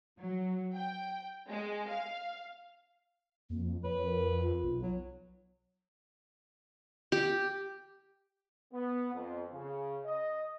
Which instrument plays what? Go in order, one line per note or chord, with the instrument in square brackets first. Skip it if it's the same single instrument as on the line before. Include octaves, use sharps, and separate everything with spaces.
[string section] F#3
G5
G#3
F5
[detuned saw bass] F2 [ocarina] A#3
[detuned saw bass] F2 [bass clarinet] B4 [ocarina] C#5
[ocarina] A#4
F4
[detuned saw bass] B1
[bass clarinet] F#3
[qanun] G4
[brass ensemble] B3
F2
C#3
D#5